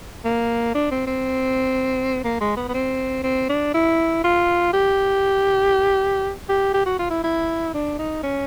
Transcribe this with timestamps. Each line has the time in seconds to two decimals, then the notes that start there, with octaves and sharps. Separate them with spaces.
0.25 A#3
0.75 D4
0.91 C4
1.07 C4
2.24 A#3
2.41 G#3
2.57 B3
2.68 B3
2.74 C4
3.23 C4
3.49 D4
3.74 E4
4.24 F4
4.73 G4
6.49 G4
6.74 G4
6.86 F#4
6.99 F4
7.11 E4
7.24 E4
7.74 D4
7.99 D#4
8.23 C#4